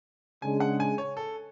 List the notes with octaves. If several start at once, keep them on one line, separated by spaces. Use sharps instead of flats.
C#3 G#3 D4 G#4 G#5
F#5
G#5
C#5
A4